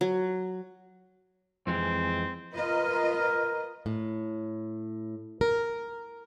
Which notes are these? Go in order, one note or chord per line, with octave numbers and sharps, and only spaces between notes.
F#3
F2 E3 G#3 C4
F4 A#4 B4 D#5
A2
A#4